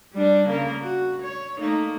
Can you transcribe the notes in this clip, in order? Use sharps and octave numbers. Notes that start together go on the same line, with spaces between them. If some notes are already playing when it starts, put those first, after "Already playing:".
G3 D4
C#3 A#3 A#4
F#4
C#5
A3 A#3 D#4